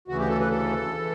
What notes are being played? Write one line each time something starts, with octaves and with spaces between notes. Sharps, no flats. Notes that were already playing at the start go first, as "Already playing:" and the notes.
D2 C#3 E3 F#4
G4
A4
B4
A4
E3